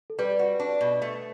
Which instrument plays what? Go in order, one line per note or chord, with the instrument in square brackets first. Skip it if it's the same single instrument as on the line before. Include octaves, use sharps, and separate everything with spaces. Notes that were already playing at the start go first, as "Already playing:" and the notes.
[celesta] A4
[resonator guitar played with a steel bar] G3 [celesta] B4
[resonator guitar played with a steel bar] F#4
D4
B2
A3